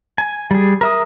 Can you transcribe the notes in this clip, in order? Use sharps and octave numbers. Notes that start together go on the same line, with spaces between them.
G#5
G3 G#4
A#4 E5 D#6